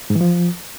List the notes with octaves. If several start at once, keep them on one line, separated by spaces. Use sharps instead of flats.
G#2
E3
F3